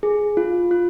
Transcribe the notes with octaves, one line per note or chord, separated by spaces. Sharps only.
G#4
F4
F4